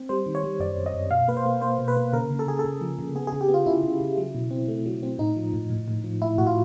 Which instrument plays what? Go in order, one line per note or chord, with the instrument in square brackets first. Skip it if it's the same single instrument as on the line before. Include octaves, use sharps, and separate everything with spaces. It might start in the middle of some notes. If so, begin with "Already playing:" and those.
Already playing: [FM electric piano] C4
G3 C5
D#3
C#5
G3
F#2 D5
F#2
D#5
F#2
B2 F5
A#3 B4
C5
A#3
A#3 C5
B2
B4
A#3
C#3 A#4
C#3
A4
C#3 G#4
A4
C#3
F3
C#3
B3 G#4
G#4
C#3
G4
B3
F4
C#3 E4
C#3
C#3
F#3
B2
C4
A3
F#3
C4
A2 D#4
F3
A2
A2
A2
F3
A2 E4
A2 F#4
F4